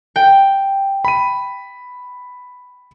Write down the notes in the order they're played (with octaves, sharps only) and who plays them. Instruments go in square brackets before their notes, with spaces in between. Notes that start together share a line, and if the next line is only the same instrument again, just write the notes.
[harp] G5
[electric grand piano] B5 D#7